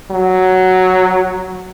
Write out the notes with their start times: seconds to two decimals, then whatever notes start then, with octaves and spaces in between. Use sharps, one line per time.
0.11 F#3